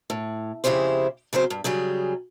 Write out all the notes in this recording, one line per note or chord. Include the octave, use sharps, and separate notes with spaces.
A2
F2 C#3 E4 G4 G#4 C5
C#3 F#3 C4 C5
G2
C#3 F#3 G3 G#4